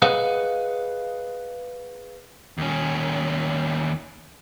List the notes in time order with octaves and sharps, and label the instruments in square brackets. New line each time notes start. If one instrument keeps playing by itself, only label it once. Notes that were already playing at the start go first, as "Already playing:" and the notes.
[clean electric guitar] G#4 B4 D#5 F5 F#5
[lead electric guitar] D#2 C#4